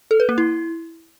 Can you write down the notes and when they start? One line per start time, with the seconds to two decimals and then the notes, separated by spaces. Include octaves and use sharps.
0.11 A4
0.20 B4
0.29 A#3
0.38 E4